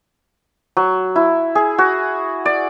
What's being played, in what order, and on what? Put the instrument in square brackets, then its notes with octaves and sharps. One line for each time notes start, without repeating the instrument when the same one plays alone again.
[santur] F#3
E4
G#4
F#4
D5